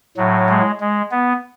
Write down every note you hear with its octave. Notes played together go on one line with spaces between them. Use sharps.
A2 F#3
G#3
G#3
B3